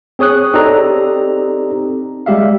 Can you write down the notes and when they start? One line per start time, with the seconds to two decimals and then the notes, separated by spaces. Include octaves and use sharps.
0.19 C4 G#4 C#5 D#6 F#6
0.54 C4 D#4 G4 A4 D5 A#5
2.26 G3 G#3 G4 E5 F5